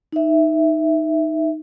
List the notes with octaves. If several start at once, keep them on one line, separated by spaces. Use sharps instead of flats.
D#4 E5